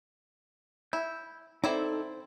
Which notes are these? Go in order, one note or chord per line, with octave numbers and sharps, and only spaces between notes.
E4 G6
C4 D#4 E4 A4 D5